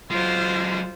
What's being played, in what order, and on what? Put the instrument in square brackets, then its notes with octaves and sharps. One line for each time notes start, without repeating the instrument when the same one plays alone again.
[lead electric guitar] F#3 G#3 [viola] F4 C5